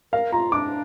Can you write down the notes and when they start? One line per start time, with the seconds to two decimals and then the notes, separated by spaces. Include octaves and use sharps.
0.13 A#4 F5
0.32 F4 A#5
0.52 D4 D6